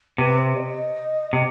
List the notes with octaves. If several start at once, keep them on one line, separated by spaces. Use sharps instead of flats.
C3 B4
C5
D#5
C3